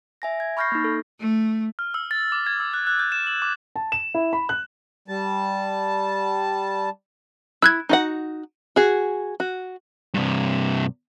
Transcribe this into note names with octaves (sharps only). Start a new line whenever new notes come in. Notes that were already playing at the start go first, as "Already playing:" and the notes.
E5 G#5 A#6
G#6
B5 C#6 F6 G6 A#6 C7
A#3 D#4
A4
A3
F6
E6
A6
D6
G#6
E6
F#6
F#6
G6
E7
F#7
D6
A5
E7
E4
B5
F#6
G3 A5
E4 E6 F#6 G#6
D#4 F#4 F#5
F#4 G#4
F#4
G2 C3